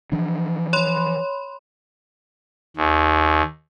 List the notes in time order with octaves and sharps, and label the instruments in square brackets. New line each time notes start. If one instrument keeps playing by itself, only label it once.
[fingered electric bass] E3 F3 D4
[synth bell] C#5 B5 C6
[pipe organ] D#2